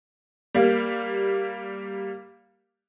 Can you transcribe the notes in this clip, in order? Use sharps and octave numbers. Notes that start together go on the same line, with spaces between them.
G3 A#3